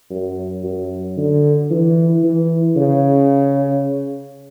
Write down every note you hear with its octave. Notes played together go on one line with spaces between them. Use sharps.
F#2
F#2
D3
E3
E3
C#3